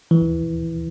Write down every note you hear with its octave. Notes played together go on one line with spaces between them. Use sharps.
E3